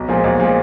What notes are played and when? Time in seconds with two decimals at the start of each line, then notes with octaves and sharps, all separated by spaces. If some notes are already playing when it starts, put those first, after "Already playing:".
Already playing: B1
0.08 A#2 F3 G#3
0.24 B1
0.39 A#2 F3 G#3